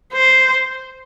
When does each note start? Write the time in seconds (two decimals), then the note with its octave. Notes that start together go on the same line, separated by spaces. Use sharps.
0.13 C5